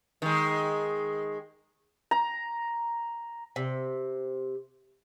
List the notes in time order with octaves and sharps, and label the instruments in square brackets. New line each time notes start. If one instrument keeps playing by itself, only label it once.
[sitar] D#3 G#3
[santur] A#5
[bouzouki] C3